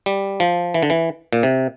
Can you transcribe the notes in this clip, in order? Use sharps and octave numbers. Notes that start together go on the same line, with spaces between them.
G3
F3
E3
D3
E3
A#2
C3